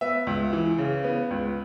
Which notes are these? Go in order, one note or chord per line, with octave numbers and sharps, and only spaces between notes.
B3 E5
C#2
E3
C#3
B3
C#2